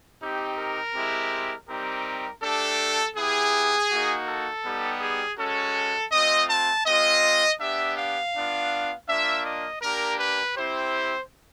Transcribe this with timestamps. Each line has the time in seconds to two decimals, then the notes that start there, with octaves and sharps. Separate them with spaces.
0.20 C4 D#4 G4
0.57 A#4
0.94 G#3 C4 E4 G4
1.68 G3 C4 D#4 G4 A#4
2.42 A3 D4 G4 A4
3.16 B3 E4 G4 G#4
3.90 A#3 D#4 F#4
4.28 A4
4.64 G3 B3 D#4 G4
5.01 G#4
5.37 G#3 C#4 F#4 A4
6.12 A3 C4 F4 D#5
6.49 A5
6.86 G#3 C4 F4 D#5
7.60 B3 D4 G4 E5
7.97 F5
8.34 B3 D4 F4
9.08 A#3 D4 F4 E5
9.45 D#5
9.81 A#3 D4 G4 A#4
10.19 B4
10.56 C4 E4 G4 C5